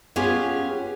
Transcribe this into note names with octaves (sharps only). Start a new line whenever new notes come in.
B3 C#4 F4 G4 G#4